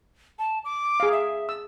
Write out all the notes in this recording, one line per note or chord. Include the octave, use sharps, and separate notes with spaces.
A5
D6
G#4 F5
E5
E6